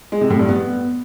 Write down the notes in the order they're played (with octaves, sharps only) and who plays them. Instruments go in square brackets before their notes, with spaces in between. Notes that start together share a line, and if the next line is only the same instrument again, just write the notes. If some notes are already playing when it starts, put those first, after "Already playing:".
[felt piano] G#3
C3
A2
G2
B3